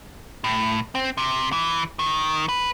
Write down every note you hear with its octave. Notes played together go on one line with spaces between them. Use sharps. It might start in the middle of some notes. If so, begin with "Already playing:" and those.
A2
C4
C3
E3
D#3
B4